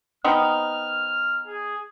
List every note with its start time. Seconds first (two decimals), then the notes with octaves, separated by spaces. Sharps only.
0.24 B3 C4 D#4 F6
1.47 G#4